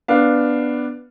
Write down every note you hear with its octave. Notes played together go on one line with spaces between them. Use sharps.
B3 D4 F5